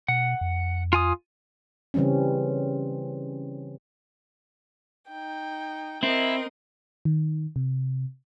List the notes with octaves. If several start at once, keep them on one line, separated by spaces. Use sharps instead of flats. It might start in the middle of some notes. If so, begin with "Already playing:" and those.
B2 F#5
F2
F4 G#5 D#6
C#3 E3 G3 C4 C#4
D#4 G5
C4 E4 A#4 D#5
D#3
C3